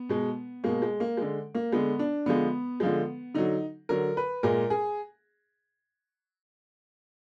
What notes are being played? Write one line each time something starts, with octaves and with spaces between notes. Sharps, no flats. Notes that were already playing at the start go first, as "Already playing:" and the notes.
Already playing: B3
B2 G#3
B2 G#3 A#3
G#3
A#3
D3 G#3
A#3
D3 G#3 B3
D4
D3 F3 G#3 B3
D3 F3 G#3
D3 F#3 D#4
D3 F#3 A#4
B4
A#2 G#3 A#4
G#4